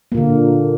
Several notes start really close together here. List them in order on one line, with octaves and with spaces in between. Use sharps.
A#3 A#2 D3